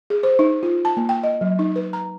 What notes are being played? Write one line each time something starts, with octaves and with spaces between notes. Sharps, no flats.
G#4
C5
D#4
F4
A5
A#3
G5
D#5
F#3
D#4
B4
A#5